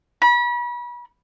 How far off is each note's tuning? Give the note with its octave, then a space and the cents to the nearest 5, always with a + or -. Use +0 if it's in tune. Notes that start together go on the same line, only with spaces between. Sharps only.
B5 -35